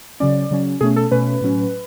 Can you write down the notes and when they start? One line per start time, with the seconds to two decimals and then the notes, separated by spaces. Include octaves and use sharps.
0.20 C#3 F#3 C#4 D5
0.51 C#3 F#3 C#4
0.81 B2 A3 C#4 G#4
0.96 A4
1.11 B2 A3 C#4 B4
1.41 A2 F#3 C#4